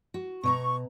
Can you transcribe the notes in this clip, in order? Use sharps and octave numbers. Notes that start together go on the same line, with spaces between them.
F#4
B2 D#5 A#5 C#6